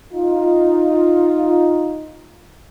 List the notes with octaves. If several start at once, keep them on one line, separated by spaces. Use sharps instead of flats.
D#4 F4